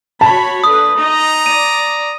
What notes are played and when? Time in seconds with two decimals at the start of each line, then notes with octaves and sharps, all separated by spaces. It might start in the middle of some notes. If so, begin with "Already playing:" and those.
0.21 F#4 C#5 A5 B5
0.64 D3 B4 D#6
0.97 D#4 D#5 A#5
1.46 D5 D#7